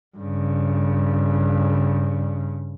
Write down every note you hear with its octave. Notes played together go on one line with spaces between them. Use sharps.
G2 C#3